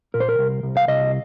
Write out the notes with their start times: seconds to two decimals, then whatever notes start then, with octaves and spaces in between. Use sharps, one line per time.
0.14 A#2 A#4
0.20 C5
0.29 A#4
0.39 C2
0.63 C2
0.77 F5
0.88 C2 D#5